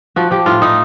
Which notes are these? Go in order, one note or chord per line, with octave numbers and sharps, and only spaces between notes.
F3 F#4
F3 G4
A2 F4
A2 D#4